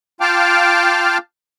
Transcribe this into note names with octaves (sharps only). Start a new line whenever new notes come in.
F4 F5 G5 A5 D6 F6